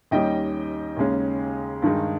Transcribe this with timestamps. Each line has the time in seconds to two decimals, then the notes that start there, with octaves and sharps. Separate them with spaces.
0.11 D#2 D#3 G3 C#4 D#5 G5
0.97 D#2 C#3 G#3 C#4
1.82 G2 D#3 G#3 D#4